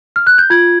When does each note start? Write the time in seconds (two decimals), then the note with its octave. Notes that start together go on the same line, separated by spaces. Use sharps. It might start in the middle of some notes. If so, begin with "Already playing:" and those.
0.16 F6
0.27 F#6
0.38 G6
0.50 F4 G#6